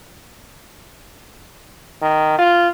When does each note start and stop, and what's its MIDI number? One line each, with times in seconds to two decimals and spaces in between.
2.02 2.38 51
2.38 2.69 65